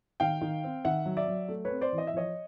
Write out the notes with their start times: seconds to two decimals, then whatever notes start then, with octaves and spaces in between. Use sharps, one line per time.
0.20 D#3 F5 G5
0.41 D#3
0.64 C4
0.85 D#3 E5 F#5
1.06 F#3
1.17 D5 E5
1.28 F#3
1.49 A3
1.65 B4 C#5
1.70 C4
1.81 C5 D5
1.93 E3
1.98 D#5
2.07 E5
2.14 F3 C#5 D#5